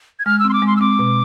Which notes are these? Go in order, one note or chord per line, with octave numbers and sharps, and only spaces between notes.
G#6
G#3 F6
E6
C4 C6
D6
G#3
C6
E6
C4 D6
B2